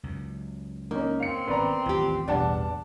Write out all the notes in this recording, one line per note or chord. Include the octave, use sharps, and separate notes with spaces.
C#2 F#2
A#3 C#4 D#4
C4 F5 C#7
G#1 B3 C#4 B4 D5 A#5
A1 D#2 F4 G4
A1 E2 B2 G3 D4 D5 F#5 A5